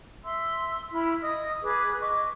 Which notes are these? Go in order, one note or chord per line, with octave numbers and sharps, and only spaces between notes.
E5 C6 E6
E4 B5 F6
D#5 D#6
G#4 B4 D6
D#5 C#6 D6